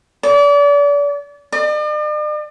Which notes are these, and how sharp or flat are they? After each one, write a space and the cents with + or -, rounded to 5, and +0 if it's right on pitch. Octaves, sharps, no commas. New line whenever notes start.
D5 -35
D5 +45